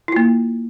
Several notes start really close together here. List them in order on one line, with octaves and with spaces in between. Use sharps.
E4 F4 A#3